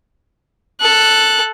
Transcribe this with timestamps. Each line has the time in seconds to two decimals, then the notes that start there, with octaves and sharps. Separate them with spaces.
0.80 A4 F#6